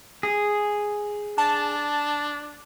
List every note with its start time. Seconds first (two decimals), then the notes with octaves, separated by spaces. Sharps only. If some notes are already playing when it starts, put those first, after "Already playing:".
0.23 G#4
1.38 D4 A5